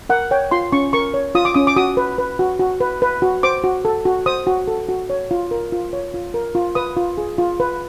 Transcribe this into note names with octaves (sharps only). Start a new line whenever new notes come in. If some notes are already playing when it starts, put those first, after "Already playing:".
A#4 F#5
C#5 G5
F4 C6
C#4 C#6
A#4 C#6
C#5
F4 D#6
D6
C#4 D#6
D6
F#4 D#6
B4
B4
F#4
F#4
B4
B4
F#4
C5 D6
F#4
A4
F#4
C5 D#6
F#4
A4
F#4
C#5
F4
A#4
F4
C#5
F4
A#4
F4
B4 D#6
F4
G#4
F4
B4